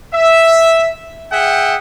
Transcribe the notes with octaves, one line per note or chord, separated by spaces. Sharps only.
E5
G#4 E5 F#5 G5